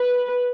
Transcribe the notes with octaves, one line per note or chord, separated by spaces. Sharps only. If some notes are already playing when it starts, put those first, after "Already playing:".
Already playing: B4